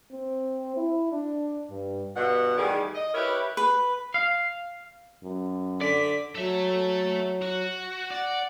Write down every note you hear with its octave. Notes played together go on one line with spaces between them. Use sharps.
C4
E4
D4
G2
G2 B2 F#5
E2 A2 D#3 G3 G#4 D5
D#5
E4 G4 A#4 B4 C#5 E5
B4
F5
F#2
D3 D5 B6
F#3 A4 E5
F#4
D5 F#5